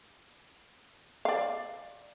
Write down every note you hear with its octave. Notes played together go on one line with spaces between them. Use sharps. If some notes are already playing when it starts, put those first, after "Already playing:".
D5 F5